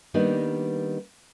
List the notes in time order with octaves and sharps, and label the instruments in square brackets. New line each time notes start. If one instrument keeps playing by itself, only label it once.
[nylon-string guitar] D#3 G3 A#3 B3 D4 D#4